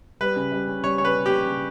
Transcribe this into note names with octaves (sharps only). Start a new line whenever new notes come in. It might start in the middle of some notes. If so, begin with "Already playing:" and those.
G3 B4
C#3
G3
C#4
G3 C#5
C#3 C#5
B4
C#3
C#4 G4
C#3